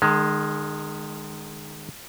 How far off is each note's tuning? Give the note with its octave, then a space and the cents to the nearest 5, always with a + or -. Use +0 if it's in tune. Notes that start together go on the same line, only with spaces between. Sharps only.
D#3 -35 G#3 +0